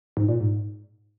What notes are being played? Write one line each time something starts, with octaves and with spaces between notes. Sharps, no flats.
G#2
A#2
G#2